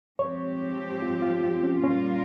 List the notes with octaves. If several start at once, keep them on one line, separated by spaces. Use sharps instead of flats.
G#2 F3 C4 G4 C#5
F4
F4
F4
C#4
A#2 G3 A#3 C#4 F4 A#4